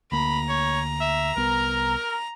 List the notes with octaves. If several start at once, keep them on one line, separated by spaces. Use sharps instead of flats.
D2 A#3 A#5 B5
C#5
E5
C2 B3 A#4